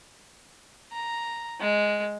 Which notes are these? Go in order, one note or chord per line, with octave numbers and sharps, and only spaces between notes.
A#5
G#3